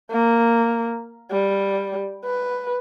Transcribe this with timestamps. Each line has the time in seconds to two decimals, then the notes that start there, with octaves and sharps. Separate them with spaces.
0.11 A#3
1.31 G3
2.25 B4